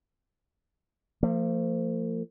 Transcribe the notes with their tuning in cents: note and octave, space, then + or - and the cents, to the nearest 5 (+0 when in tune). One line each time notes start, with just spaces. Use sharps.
F3 -10 A#3 -45